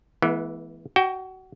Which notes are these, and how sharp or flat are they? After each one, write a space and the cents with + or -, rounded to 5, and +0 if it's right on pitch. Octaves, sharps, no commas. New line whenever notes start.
E3 +0 G#3 +35 B3 -30
F#4 +25 G5 +0